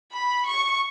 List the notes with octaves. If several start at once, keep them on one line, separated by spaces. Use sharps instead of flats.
B5
C#6